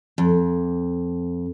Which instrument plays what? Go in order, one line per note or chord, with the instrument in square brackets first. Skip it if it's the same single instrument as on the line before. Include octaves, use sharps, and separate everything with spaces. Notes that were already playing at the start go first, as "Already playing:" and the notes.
[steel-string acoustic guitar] F2